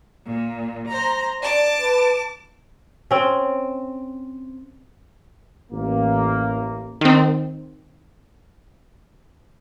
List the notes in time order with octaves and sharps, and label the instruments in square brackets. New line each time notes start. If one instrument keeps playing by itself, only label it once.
[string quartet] A#2
C5 A#5
[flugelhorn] D5 [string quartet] A5 D6
[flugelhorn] B4
[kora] C4 C#4
[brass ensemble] A1 A#3
[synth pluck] D#3 C4